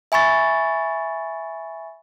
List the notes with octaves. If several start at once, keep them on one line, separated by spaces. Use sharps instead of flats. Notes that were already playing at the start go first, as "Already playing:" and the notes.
E5 G#5 B5 C#6 A6